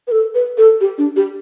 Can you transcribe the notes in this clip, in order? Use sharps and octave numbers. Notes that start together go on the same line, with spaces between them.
B4
A4
B4
A4
G4
D4
G4